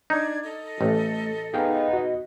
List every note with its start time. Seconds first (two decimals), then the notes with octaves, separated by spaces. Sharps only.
0.10 D4 D#4 G#6
0.42 A4 D#5
0.81 A1 A3
1.54 B3 D#4 G#4 F5 G5
1.93 F#4 D#5